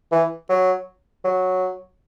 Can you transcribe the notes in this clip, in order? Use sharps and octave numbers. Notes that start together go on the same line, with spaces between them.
E3
F#3
F#3